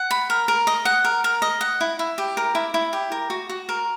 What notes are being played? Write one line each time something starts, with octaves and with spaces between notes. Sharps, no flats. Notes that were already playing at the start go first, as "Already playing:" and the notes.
Already playing: F#5
B5
A#4
A#4
D#5
F#5
A#4
A#4
D#5
F#5
E4
E4
G4
A#4
E4
E4
G4
A#4
F#4
F#4
A#4